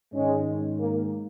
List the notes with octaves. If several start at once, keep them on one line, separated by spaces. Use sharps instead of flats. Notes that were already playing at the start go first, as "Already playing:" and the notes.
G#2 D#3 G#3 C#4
A#3